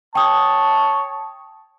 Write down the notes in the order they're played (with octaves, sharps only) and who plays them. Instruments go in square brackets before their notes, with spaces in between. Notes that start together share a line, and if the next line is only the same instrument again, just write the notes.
[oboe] C#5 [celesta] G5 D#6 [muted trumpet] A5